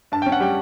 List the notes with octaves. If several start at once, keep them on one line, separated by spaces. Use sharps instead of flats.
G2 A5
C#4 G5
F#5
G3 G5